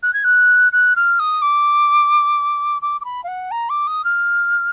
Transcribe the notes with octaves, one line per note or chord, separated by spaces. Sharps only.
F#6
G#6
F#6
F#6
F6
D#6
D6
D6
D6
B5
F5
F#5
A#5
D6
D#6
F6